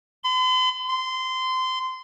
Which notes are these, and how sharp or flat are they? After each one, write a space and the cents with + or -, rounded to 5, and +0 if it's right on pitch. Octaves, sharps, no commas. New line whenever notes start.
C6 -45
C6 -20